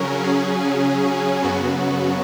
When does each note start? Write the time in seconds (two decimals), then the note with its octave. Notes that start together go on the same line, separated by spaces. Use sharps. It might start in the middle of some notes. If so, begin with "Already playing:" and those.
Already playing: C#3 F#3 C#4 A#4
0.24 G#4
1.42 F#2 C#3 F#3 B3 F#4